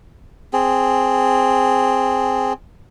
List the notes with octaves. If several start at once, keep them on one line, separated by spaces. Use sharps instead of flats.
C4 G#4